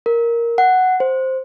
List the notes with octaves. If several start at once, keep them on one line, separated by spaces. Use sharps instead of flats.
A#4
F#5
C5